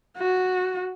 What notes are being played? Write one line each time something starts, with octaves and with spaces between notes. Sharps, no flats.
F#4